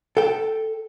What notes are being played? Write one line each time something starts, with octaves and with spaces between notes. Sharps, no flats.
A4 G5